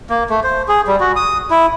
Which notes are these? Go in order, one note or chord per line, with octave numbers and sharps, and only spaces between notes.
A#3
A3
C5
G#4
G3
F#4
D#6
E4